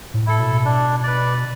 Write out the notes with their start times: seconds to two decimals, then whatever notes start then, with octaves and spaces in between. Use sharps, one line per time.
0.14 A2
0.26 E4 A4
0.40 B2
0.65 D4
1.03 B4 D5